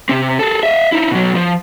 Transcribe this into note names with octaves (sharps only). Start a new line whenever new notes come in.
C3 C4
G#4 A4
D#5 E5
D#4 E4
B2 F#3
F3